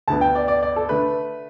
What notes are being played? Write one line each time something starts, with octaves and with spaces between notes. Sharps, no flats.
D2 D3 B3 A5
G5
D5
D5
D5
A4
D3 A3 B4